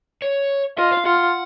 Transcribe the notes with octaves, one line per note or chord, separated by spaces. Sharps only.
C#5
F4 D#5
F5
F4 F#5